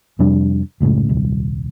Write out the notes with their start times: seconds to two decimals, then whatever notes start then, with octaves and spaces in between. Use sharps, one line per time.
0.19 F2 C3 G3 D4
0.80 F#1 C#2 A2 C#3
1.09 D#1 C2